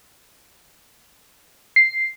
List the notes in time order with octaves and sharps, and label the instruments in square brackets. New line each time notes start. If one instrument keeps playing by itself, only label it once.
[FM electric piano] C7